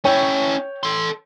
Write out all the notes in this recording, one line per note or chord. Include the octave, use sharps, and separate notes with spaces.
C#4 E4 C#5 G5
A4 C6